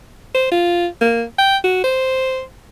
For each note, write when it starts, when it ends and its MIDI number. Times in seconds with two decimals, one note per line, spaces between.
0.35 0.47 72
0.51 0.87 65
1.01 1.24 58
1.38 1.57 79
1.64 1.82 66
1.84 2.42 72